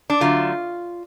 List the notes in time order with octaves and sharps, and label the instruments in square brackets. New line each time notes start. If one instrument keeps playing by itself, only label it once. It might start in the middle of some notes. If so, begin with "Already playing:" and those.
[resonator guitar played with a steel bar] D4
D3 F#3 A3 F4